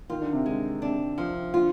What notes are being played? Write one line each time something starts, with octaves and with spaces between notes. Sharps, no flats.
D#3 F4
D3
C3
D3 G#3
C3 D4
F3
D3 F4